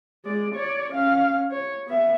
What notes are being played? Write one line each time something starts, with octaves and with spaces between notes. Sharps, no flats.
G#3 D5
C#5 D5
C#4 F5
C#5
B3 E5